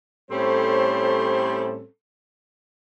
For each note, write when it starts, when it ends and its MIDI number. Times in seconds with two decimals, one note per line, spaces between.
0.31 1.84 45
0.31 1.84 55
0.31 1.84 60
0.31 1.84 61
0.31 1.84 69
0.31 1.84 72